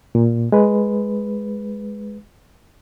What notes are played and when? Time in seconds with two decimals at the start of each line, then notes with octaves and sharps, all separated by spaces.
0.15 A#2
0.52 G#3 B4